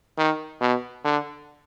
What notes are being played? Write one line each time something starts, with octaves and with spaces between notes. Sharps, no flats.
D#3
B2
D3